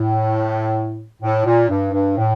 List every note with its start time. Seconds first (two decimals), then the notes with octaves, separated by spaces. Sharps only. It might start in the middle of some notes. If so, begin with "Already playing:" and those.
Already playing: A2
1.22 A2
1.45 A#2
1.69 G2
1.92 G2
2.17 A2